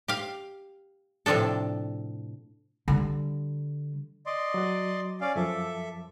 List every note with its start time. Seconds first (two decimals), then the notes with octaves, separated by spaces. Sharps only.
0.08 G4 F5
1.26 A2 C3 F3 D4 A4
2.88 D3 G3
4.26 D5 D#5 C6
4.54 F#3 F#4
5.21 C#4 D5 F5
5.36 F#2 F3 A4 E5 D6